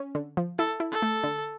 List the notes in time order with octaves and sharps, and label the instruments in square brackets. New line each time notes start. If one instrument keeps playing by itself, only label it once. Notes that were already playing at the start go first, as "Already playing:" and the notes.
Already playing: [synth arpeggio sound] C#4
D3
F3
[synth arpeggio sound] E4 [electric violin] A4
[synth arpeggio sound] E4
[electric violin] A4
[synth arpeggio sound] A3
D3